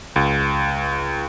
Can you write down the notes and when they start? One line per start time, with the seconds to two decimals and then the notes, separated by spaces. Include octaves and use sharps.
0.16 C#2